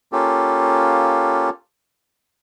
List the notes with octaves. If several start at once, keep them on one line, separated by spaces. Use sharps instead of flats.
A#3 C#4 F4 G4 A4